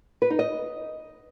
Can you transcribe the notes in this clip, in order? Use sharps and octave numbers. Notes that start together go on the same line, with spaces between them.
B4
D#4
D#5